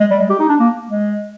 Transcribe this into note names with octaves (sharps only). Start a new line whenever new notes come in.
G#3
G3
G#3
G4
D#4
D4
A#3
G#3